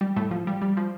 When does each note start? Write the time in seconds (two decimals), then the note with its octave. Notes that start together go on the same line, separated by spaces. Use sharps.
0.01 G3
0.16 A2 A3
0.31 F3
0.47 G3
0.62 G3
0.77 F3